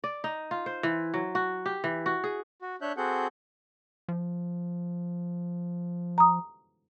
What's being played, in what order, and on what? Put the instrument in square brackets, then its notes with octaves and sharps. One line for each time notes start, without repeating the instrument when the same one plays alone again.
[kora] D5
D#4
F4
C5
E3
F#3
F#4
G4
E3
F#4
G#4
[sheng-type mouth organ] F#4
D4 C#5 E5 F#6 G6
C4 F#4 G#4 A4 F#5 G6
[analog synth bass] F3
[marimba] A#5 D#6